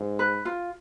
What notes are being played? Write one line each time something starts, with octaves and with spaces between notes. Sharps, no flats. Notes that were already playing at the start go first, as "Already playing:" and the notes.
Already playing: G#2
B4
F4